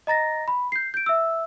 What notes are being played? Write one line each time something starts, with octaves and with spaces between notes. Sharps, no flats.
D#5 A#5 A6 A#6
B5
G6 C7
G6 D7
E5 E6